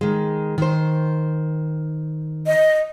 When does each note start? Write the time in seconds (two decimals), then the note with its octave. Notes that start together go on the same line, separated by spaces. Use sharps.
0.01 D#3 G#3
0.58 D#3 C5
2.47 D#5